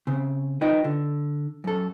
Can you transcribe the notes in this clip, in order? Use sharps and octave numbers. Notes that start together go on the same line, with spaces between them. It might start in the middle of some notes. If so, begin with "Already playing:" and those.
C#3 C4
D#4 F4 B4 D#5 G5
D3
F#2 A4